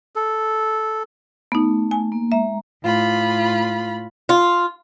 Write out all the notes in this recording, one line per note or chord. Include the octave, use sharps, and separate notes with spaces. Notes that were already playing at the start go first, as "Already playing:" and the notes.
A4
A3 B3 D#4
G#5
A#3
G#3 E5 A#5
A2 F4 B5
F4